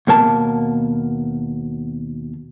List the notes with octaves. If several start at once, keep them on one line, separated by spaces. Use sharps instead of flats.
D#2 B2 A#3 A5